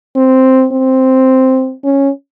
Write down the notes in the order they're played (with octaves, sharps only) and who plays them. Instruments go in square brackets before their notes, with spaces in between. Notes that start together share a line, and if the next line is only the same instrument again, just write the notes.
[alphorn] C4
C4
C#4